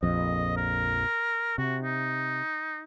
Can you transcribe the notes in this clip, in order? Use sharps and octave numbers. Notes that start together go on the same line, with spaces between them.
A#1 F2 D#5
A#4
C3 F#4
D#4